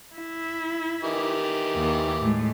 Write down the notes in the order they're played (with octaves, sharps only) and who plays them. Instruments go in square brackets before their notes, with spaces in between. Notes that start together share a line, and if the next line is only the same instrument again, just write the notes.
[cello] E4
[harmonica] D#3 E3 G4
[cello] D#2
A2 G#3